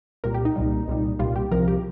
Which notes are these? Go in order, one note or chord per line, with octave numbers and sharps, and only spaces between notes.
C2 A#2 G3 A#4
G4
D#4
C2 A#2 G3
C2 A#2 G3
C2 A#2 G3 F4
G4
C2 C3 F3 A#4
G4